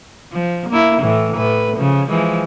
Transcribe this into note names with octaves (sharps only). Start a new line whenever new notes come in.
F3
A#3 E4
A2 E3
A2 B4
C#3 F3
E3 F3 G#3